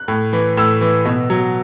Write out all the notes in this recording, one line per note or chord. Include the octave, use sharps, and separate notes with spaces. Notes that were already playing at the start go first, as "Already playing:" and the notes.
Already playing: F#6
A2
E3
A2 E6
E3
B2
F#3